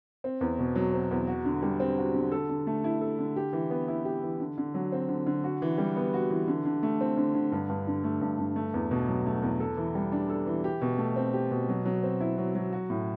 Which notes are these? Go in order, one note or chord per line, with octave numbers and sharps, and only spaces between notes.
C4
E2
B2
F#3
C4
E2
F#4
D3
G3
C4
F#4
D3
A4
D3
A3
E4
A4
D3
G4
E3
B3
E4
G4
E3
D3
D3
F#3
C4
D3
D3
F#4
E3
G3
B3
F#4
E3
D3
D3
A3
C4
D3
D3
G2
G2
D3
A3
G2
G2
A3
E2
B2
F#3
A3
E2
A4
E3
G3
D4
A4
E3
G4
B2
A3
C4
G4
B2
F#3
F#3
C4
E4
F#3
F#3
F#4
A2